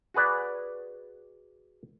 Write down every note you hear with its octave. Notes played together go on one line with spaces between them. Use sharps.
F#4 G#4 B4 D5